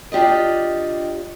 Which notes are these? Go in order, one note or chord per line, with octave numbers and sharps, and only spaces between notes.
D4 F4 G4 D5 D#5